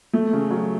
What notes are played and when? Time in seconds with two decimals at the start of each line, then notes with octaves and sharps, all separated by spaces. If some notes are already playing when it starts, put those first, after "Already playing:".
0.13 A3
0.33 C#3
0.51 F#3